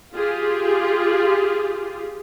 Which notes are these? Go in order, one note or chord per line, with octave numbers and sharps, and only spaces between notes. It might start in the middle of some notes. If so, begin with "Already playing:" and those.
F4 G4 G#4